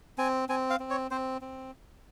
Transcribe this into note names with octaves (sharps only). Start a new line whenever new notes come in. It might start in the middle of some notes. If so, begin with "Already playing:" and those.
C4 G#5
C4 G#5
F5
C4
C#5
C4 C5
C4